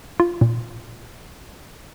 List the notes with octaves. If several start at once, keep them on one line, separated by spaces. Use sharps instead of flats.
F4
A#2